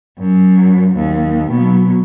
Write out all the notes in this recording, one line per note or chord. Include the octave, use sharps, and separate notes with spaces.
F#2
D#2
B2 F#3